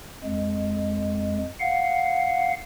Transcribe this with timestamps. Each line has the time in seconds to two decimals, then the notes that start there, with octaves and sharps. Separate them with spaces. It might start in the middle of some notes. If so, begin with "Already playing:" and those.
0.24 F2 G#3
1.60 F5 F#5